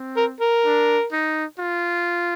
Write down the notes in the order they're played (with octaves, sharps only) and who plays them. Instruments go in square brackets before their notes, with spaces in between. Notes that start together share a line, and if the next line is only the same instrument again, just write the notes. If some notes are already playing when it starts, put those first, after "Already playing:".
Already playing: [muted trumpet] C4
[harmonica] A#4
A#4
[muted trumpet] D4
D#4
F4